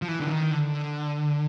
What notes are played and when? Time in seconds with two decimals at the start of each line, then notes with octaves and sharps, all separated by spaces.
0.02 F3
0.08 E3
0.20 D3
0.30 D#3
0.51 D3